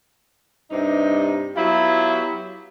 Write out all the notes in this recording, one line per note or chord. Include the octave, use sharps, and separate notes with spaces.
G2 C3 D#4
F#3 B3 E4 F4 G4